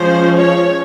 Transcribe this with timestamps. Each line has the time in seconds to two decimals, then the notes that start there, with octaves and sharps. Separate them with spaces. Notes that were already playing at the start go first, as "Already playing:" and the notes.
Already playing: F3 G#3 C#4 C5
0.37 C#5